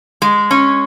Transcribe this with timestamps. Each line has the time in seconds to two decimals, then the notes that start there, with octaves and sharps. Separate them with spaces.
0.22 G#3
0.51 C#4